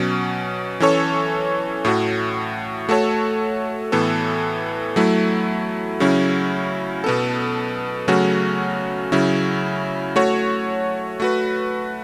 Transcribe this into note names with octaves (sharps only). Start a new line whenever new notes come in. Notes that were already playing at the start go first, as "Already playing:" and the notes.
Already playing: B2 F#3 C#4
E3 C#4 A4 C#5
A2 A3 F#4
A3 F#4 A4 C#5
A2 E3 B3 A4
F#3 A3 E4
C#3 F#3 C#4 E4
B2 B3 A4
C#3 F#3 A3 C#4 F#4
C#3 F#3 C#4 E4
A3 F#4 C#5
A3 F#4 B4